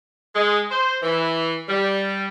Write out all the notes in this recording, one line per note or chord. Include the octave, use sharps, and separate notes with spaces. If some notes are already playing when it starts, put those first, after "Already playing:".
G#3
C5
E3
G3